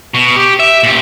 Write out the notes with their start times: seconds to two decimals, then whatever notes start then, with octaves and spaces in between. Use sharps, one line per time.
0.14 B2
0.36 G4
0.59 E5
0.83 A#2 G4